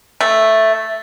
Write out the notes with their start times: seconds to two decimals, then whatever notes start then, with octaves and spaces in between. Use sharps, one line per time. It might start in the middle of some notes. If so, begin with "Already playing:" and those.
0.21 A3